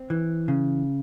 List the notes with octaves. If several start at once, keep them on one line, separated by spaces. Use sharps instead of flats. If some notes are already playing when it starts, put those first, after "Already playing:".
Already playing: C4
E3
C#3